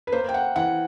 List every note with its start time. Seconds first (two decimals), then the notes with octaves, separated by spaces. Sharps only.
0.07 B4
0.12 A#3 C5
0.29 G5
0.34 F#5
0.56 E3 F#5